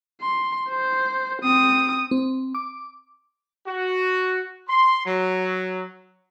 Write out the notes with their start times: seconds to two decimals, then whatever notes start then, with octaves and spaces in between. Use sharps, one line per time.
0.21 C6
0.69 C5
1.42 C4 D#6
2.11 C4
2.55 D6
3.67 F#4
4.69 C6
5.06 F#3